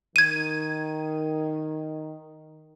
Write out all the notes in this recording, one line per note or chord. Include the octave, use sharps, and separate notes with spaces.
D#3 G#6 D#7